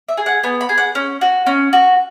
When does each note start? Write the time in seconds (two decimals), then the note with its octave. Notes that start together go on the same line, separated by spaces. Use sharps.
0.08 E5
0.17 G#4
0.26 F#5
0.43 B3 G#5
0.61 B5
0.69 G#4
0.78 F#5
0.95 C#4
1.21 F#4
1.46 C#4
1.73 F#4